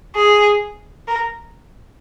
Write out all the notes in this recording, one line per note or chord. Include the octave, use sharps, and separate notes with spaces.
G#4
A#4